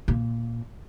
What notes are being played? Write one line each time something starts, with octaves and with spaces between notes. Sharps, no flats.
A#2